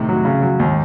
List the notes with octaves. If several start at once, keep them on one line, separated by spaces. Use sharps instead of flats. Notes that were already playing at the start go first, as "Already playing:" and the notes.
Already playing: A2 C3 D#3
F#3
C#3
F#3
D#2 G#2